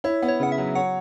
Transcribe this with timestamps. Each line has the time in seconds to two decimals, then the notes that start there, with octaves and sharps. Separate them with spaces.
0.04 E4 C#5
0.22 B3
0.28 C#5
0.40 C#3 F#5
0.52 E5
0.58 F#3
0.75 C#5 F#5